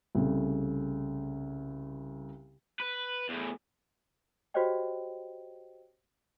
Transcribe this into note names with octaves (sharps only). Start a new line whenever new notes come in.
C2 C#3 A3
B4
E2 A2
F#4 G4 C5 C#5 D#5 G5